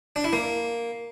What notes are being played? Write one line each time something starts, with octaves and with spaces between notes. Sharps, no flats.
D4
E4
A#3